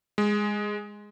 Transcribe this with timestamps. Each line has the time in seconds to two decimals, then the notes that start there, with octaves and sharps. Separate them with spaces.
0.18 G#3